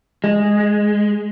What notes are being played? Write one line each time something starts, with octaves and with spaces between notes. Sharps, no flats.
G#3